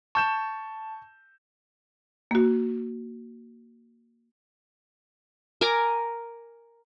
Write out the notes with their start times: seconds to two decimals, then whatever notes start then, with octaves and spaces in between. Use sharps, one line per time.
0.15 A5 C#6 G6 E7
2.31 A#3 F#4
5.61 A#4 G#5 A#5 D6